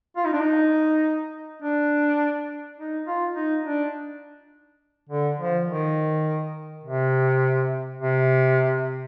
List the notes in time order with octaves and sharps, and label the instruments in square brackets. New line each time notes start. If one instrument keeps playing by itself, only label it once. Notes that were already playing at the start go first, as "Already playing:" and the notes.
[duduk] F4
D#4
D4
D#4
D4
D#4
F4
D#4
D4
D3
F3
D#3
C3
C3